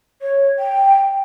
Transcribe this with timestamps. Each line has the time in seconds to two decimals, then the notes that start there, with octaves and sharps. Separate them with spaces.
0.22 C#5
0.59 G5